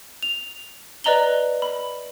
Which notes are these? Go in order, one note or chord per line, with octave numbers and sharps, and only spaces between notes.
F7
B4 D5 D#5 A#5 F#7 G7
B5